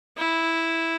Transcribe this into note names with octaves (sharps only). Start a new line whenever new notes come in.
E4